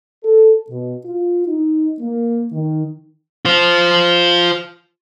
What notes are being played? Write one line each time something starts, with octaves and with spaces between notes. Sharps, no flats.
A4
B2
F4
D#4
A#3
D#3
F4 C5